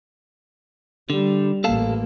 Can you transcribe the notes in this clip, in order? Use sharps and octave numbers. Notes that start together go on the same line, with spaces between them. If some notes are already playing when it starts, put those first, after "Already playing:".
D3 G3
A1 A#3 A4 F5 A5